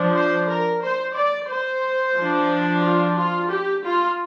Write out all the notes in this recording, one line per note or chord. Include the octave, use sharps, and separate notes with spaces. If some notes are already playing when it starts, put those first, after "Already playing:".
Already playing: F3 D4
C5
A#4
C5
D5
C5
F3 D4
F4
F4
G4
F4